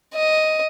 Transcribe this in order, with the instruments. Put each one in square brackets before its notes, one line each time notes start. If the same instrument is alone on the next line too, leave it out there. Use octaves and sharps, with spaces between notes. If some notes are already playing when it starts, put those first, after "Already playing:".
[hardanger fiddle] D#5